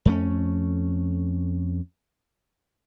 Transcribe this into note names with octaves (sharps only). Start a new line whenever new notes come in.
F2 A3 C#4